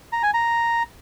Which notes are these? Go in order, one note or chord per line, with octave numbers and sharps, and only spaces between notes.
A#5
G#5
A#5